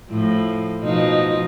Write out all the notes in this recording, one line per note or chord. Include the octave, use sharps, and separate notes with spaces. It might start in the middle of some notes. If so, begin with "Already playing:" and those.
A2 F3
B2 F3 D#4